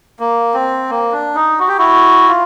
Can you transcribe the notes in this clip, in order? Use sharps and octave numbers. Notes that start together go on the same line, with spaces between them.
A#3
C4
A#3
D4
D#4
F#4
G4
E4 F#4
F4